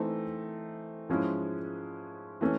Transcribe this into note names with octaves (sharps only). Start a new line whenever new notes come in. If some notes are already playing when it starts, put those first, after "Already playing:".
Already playing: E3 A3 C4 D#4
G#2 F3 G#3 C#4 E4
E3 A3 C#4